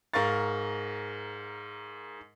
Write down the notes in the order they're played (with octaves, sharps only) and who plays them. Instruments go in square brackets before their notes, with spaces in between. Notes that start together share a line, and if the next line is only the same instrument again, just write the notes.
[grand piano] G#2 A#4 F5 C#6 A6